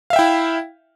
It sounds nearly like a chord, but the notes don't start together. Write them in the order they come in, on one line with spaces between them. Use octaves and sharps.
F5 E5 G5 E4